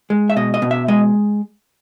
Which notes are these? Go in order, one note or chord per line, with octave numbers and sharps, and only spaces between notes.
G#3
E5
B2 D#5
D#5
B2
E5
G#3 D#5